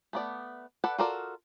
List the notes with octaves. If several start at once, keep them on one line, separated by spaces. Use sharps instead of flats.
A3 B3 D5
A4 B4 D5 F#5
F4 F#4 A4 A#4 D5